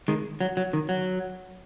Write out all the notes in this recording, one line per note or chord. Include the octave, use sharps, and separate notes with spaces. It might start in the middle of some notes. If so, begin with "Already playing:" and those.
D#3 G#3
F#3
F#3
D#3
F#3